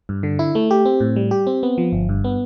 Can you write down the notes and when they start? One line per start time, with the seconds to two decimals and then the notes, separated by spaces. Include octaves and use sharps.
0.09 G2
0.23 D3
0.39 E4
0.55 A3
0.71 G4
0.85 C4
1.00 A2
1.16 G3
1.31 G4
1.47 C4
1.63 B3
1.78 F3
1.93 G1
2.09 G2
2.24 B3